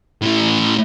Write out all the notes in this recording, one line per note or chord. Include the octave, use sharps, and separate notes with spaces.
A2 E3